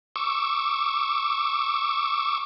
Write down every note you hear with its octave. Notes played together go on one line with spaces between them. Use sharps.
C#6 D6 E6